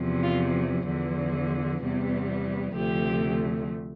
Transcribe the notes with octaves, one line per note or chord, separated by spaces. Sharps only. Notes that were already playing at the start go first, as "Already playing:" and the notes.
Already playing: E2 C3 F3
F4
E2 D3 F3
E2 C3 G3 B3
D2 C3 F3 A3 G4